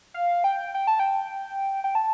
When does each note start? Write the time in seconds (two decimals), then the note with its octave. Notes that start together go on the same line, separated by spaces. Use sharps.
0.14 F5
0.44 G5
0.74 G5
0.87 A5
1.00 G5
1.84 G5
1.95 A5